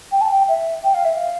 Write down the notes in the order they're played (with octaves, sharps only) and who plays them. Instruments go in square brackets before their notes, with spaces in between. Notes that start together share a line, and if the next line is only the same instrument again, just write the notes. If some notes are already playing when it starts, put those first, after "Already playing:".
[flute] G5
A5
G5
E5
G5
F5
E5
F5